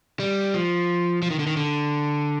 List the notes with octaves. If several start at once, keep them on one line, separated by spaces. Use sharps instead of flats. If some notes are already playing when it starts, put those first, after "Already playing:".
G3
F3
F3
D#3
D3
D#3
D3